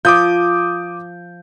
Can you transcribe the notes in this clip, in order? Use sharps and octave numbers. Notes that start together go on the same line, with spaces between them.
F3 D6 D#6 G6